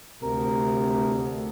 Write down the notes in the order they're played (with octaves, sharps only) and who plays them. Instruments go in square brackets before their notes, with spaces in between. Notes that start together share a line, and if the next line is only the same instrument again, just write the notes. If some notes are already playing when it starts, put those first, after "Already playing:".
[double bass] D2 [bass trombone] C3 [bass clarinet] A#4